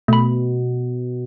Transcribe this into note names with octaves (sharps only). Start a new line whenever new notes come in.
B2 A3 B5